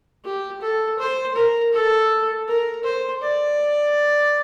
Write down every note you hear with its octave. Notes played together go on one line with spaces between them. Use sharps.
G4
A4
C5
A#4
A4
A#4
C5
D5